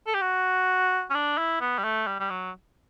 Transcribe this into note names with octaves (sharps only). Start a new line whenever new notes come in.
A4
G4
F#4
C#4
D4
E4
B3
G3
A3
G3
G3
F#3